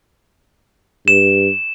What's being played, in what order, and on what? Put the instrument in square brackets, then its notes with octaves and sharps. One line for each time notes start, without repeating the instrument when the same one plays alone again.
[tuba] G2 [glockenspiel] E7